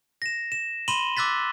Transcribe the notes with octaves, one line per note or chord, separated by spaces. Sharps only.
A#6 E7
E7
B5 C6 D#7 E7 F#7 G7
D6 E6 F#6 A6 B6